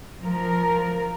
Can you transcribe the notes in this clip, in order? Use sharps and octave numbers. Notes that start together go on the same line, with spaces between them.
F3 A#4